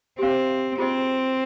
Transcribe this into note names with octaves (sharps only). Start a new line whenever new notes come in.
C4 G4 C5 F5
C4 F4 G#4 C5 D#5